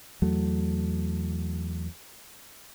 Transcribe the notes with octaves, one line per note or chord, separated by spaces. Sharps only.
E2 F#3 A3